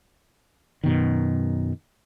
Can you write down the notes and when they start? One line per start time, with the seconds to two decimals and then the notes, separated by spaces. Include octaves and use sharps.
0.84 F#2 B2 D#3